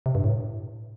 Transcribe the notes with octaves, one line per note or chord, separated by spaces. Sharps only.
C3
G2
A2